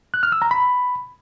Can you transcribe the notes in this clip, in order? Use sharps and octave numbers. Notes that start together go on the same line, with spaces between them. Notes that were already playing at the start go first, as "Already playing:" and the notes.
F#6
F6
E6
A#5
B5